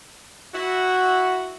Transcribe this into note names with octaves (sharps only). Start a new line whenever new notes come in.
E4 F#4